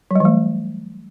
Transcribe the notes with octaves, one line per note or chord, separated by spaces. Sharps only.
E3 F#3 G3 A3